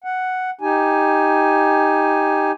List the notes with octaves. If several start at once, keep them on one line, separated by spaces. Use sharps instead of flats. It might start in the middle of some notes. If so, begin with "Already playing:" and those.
F#5
D#4 G4 G#5